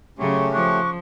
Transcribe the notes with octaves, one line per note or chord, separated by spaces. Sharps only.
C#3 F#3 A3 C#4 G4 C6 C#6
F3 C#6 D6 F#6